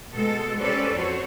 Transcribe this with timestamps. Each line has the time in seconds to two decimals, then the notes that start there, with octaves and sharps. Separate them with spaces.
0.14 B2 G#3 A4
0.61 C#4 G4 A4 B4 C5 D5
0.94 F2 F#4 C5 C#5